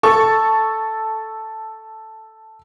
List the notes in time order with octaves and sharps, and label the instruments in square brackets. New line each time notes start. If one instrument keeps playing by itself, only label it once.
[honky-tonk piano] A4 C#6